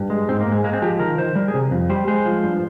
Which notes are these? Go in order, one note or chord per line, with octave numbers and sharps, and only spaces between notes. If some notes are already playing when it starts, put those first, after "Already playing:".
Already playing: G2
G#3
G#2 C4
A#3
G#2
G#3
G#3 A#3
C4
F3 G4
D#3 A#4
D#3 C5
G3 A#4
G#4
C3
F2
G3 C5
G#3 C5
F3
G2